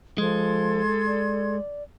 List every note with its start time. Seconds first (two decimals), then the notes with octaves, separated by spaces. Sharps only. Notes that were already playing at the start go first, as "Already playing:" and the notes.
0.18 F3 G#3 A4 C6 G#6
1.07 D5